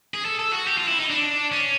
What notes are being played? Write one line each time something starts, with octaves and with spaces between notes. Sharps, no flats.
G#4
A4
A4
F#4
G4
F4
E4
D#4
D4
C#4